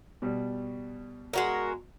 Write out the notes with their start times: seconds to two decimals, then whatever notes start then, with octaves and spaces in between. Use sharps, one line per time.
0.22 B2 G3
1.33 G#3 F#4 A#4